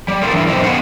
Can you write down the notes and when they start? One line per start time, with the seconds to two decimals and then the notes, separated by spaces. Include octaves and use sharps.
0.08 G3
0.22 A3 C4 D4 F4 G#4 A#4
0.33 E3 D4 E4
0.47 F#2 B2 C4 D#4 G4 C5
0.64 B3 G#4 B4 F5 F#5